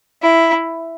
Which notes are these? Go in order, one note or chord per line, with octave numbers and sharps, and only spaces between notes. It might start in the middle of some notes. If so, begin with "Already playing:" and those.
E4